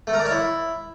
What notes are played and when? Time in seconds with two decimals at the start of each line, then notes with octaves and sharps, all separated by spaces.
0.07 A3
0.13 A#4
0.19 D5
0.25 C#5
0.31 E4